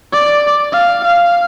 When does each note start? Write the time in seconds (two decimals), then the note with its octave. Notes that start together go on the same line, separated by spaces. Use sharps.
0.13 D5
0.72 F5
1.05 F5